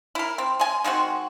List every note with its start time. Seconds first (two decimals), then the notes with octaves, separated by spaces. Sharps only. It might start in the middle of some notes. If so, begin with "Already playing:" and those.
0.15 E4 A#4
0.38 C4
0.59 G#3 G#5
0.84 D#3 G#3 C4 F#4